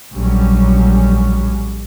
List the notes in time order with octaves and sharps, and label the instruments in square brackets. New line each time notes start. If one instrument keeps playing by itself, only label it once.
[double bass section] A#1 A2 F#3 G3 C#4